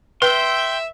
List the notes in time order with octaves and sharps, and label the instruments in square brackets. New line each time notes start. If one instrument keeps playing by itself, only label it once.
[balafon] B4 [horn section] E5 [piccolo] G5 [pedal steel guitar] C6